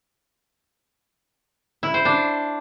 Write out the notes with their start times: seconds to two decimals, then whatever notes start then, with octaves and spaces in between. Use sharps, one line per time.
1.83 E4
1.94 C5
2.05 D4